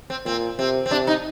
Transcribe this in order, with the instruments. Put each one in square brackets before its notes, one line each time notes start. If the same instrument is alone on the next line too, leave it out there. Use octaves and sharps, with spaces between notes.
[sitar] C4
[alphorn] A#2 [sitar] C4
[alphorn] C3 [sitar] C4
[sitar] C4
[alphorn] C3 [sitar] D4
[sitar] D#4